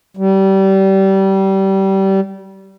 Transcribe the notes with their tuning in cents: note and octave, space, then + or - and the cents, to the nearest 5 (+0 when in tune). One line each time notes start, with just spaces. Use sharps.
G3 -25